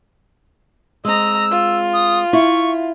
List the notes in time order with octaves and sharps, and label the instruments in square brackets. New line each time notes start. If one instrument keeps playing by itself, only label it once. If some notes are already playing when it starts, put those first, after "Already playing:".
[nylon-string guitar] G#3 C4 [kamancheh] D#5 A#5 [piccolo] E6
[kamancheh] F4
[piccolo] D#6
[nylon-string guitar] E4 [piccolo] C#6